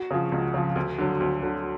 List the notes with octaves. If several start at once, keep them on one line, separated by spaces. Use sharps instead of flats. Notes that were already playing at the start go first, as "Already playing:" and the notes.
Already playing: F#4
C#3 F3
C#2
C#3 F3
D2
D3 F#3
D2
D3 F#3